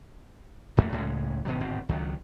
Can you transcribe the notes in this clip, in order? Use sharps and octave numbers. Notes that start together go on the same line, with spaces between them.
D#1 F2 A3 A#3
C#2 A2 C#3 G#3
G#1 B2 D#3 F#3
D1 G#1 B2 C4
C#2 D#3 F#3